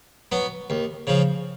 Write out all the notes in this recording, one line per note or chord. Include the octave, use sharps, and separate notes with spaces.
F#3 B3
D#2
C#3 F3